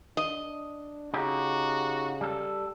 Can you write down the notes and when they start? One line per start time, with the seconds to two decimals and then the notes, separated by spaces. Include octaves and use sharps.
0.17 D4 D#5
1.14 C#3 D#4 F#4 G4
2.21 G3 A4